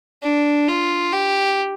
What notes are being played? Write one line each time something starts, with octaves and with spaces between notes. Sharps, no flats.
D4
F4
G4